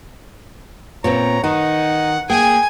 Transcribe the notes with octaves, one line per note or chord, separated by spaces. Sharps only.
A#2 B3 C4 C#5 A#5
D#3 D#4 F#5
A#3 G#4 G5 G#5